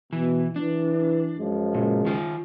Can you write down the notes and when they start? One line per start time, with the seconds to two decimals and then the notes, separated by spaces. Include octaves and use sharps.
0.13 B2 E3
0.56 E3 D4
1.38 F#2 F3 G#3
1.74 C#2 A#2
2.05 D#3 F4